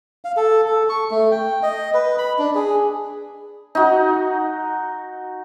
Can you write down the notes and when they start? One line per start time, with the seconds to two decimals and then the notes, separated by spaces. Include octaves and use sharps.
0.25 F5
0.37 A4
0.68 A4
0.89 C#6
1.11 A3
1.31 G5
1.63 D#5
1.94 B4
2.18 B5
2.39 D4
2.55 G#4
3.75 D#4 F#4